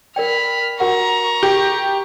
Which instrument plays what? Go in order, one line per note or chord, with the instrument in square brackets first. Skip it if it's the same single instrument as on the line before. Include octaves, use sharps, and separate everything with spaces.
[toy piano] A#4 D5 G5 [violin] B5 F6
[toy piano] F#4 A#4 F#5 [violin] A#5 C#6
[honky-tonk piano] G4